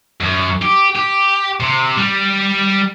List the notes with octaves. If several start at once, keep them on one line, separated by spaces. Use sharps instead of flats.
F#2
G4
G4
C3
G3